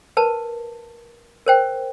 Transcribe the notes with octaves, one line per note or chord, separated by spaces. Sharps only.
A#4 B4 A5
A#4 C5 G5